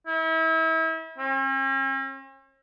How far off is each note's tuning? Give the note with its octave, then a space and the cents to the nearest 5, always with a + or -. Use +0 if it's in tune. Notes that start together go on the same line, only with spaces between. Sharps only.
E4 -35
C#4 -45